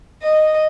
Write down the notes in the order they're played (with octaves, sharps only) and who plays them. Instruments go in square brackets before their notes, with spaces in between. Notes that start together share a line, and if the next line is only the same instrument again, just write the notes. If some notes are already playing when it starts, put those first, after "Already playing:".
[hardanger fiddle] D#5